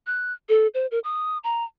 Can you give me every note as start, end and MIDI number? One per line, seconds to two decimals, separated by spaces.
0.07 0.33 90
0.49 0.67 69
0.74 0.87 72
0.91 0.99 70
1.04 1.38 87
1.44 1.64 82